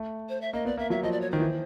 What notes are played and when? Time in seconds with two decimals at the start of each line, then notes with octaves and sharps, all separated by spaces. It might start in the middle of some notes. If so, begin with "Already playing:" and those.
Already playing: A3
0.29 C5
0.41 E5
0.53 A#3 D#5
0.65 B3 D5
0.77 A#3 E5
0.90 F#3 E5
1.03 F3 D#5
1.12 D5
1.21 C#5
1.31 D#3 C5
1.40 E3